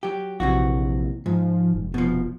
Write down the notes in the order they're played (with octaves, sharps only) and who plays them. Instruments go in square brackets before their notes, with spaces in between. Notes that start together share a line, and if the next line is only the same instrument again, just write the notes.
[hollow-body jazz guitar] F#3 G4
[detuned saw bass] A#1 [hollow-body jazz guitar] C3 E3 F#4
[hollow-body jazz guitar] G#2 [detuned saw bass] F3
[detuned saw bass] F1
[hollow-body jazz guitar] B2 F3